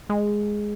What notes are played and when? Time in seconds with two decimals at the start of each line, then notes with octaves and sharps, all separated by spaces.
0.10 G#3